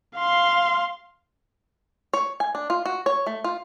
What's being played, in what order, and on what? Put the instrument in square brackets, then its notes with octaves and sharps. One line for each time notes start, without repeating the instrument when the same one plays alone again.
[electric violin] F5 C6
[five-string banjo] C#5
G#5
D4
F4
F#4
C#5
A3
F4